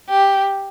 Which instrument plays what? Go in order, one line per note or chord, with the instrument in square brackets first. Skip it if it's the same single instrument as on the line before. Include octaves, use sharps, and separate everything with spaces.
[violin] G4